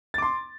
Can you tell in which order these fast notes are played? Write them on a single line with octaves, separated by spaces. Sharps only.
A6 D6 C6